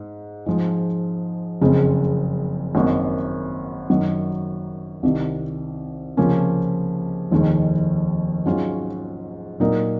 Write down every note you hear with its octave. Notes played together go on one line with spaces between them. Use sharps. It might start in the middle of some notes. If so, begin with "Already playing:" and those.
Already playing: G#2
G#2 F3 G#3
F#1 F2 C#3 G#3 C4
G#1 F#2 D#3 A#3
F#2 D#3 F#3
C2 C3 D#3
C#2 C3 F3 A#3 C#4
F1 D#2 D#3 G#3
G#2 F#3 C#4 F4
A#2 F#3 A#3 D#4 A#4